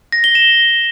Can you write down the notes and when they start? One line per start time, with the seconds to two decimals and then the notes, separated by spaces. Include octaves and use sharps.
0.12 A#6
0.24 G7
0.35 E7